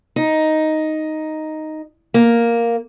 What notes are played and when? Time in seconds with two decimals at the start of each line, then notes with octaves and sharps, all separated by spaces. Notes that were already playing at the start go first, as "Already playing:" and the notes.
0.16 D#4
2.14 A#3